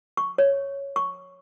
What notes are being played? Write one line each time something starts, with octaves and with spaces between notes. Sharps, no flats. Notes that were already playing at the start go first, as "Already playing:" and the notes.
C#6
C#5
C#6